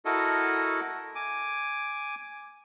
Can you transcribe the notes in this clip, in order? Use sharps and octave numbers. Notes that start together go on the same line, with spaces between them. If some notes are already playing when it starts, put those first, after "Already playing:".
E4 F#4 A4 A#4 D#5
G#5 D6